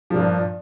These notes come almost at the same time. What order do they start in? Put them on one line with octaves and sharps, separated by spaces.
F3 A#2 G2